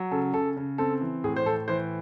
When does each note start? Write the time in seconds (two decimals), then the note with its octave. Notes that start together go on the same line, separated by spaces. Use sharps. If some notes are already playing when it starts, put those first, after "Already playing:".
Already playing: F#3
0.11 C#3 A4
0.33 C#3 A4
0.57 C#3
0.78 C4 A4
1.01 E3
1.24 A2 G#4
1.36 C5
1.46 A2 A4
1.68 E3 C5